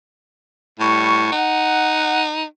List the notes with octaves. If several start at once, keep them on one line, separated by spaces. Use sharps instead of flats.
A2 G3 C#6
D#4 F#5